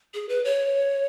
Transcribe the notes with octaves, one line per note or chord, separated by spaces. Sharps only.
G#4
B4
C#5